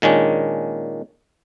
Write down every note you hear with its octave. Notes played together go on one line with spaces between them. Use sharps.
A#2 D#3 G#3 C#4 D4